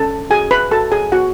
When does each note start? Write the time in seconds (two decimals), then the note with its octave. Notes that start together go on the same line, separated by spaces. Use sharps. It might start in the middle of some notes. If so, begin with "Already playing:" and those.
Already playing: C#4 A4 A5
0.30 F#4 G#4 G#5
0.51 B4 B5
0.71 F#4 A4 A5
0.92 G#4 G#5
1.12 B3 F#4 F#5